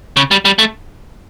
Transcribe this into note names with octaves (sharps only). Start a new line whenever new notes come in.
C#3
G3
G3
A3